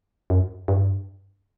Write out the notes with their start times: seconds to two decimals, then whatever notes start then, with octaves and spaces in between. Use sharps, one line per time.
0.30 F#2
0.68 G2